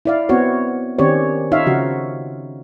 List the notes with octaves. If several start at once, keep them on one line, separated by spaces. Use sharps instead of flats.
E4 D5 F5
B3 C4 F#4 C#5
D#3 C4 C#4 G4 C#5 D5
D#4 F4 C#5 E5 F5
C#3 F3 F#4